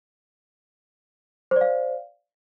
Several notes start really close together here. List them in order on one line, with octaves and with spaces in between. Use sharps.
C5 D5 F5